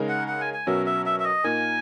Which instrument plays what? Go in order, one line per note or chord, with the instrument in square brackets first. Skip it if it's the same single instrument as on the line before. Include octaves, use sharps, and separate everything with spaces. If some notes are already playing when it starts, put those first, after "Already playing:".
Already playing: [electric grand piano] C#3 G#3 D#4 A#4
[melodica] F#5
F#5
G#5
G#5
[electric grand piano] B2 F#3 C#4 F#4 A#4 [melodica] E5
[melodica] E5
E5
E5
D#5
[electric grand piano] A#2 A#3 D#4 A#4 [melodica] G#5